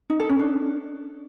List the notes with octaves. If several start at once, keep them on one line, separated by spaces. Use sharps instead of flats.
D#4
A4
C#4
D4